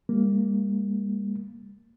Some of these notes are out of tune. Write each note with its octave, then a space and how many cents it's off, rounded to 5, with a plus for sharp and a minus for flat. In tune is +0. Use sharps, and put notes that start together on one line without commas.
G3 +40 A#3 +0